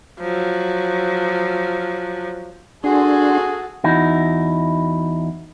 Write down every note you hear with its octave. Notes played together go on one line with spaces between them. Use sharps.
F3 F#3
D4 F#4 G#4 A4 G#5 C6
E2 D#4 E4 F#4